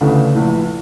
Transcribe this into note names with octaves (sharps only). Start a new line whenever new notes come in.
D2 C#3 E3 A3 D4
A#1 A2 E3